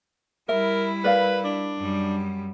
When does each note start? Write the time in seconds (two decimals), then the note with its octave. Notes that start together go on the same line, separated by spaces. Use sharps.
0.49 G3 E4 A#4 E5
1.04 A#4 B4 D5 F5
1.45 D4
1.78 F#2 G3